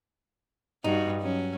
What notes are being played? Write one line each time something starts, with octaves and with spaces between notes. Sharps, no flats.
G2 G3 D#4 F#4
F#3 C#4